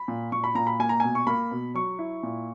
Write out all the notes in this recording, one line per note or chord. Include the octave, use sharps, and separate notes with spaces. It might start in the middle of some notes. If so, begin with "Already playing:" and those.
Already playing: B5
A#2
A#2 C#6
B5
A#2 A#5
B5
A#3 G#5
A#5
B2 G#5
C#6
A#3 B5
B2
F#3 C#6
E4
A#2